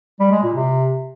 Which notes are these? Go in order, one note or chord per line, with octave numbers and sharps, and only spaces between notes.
G3
G#3
A#2
C3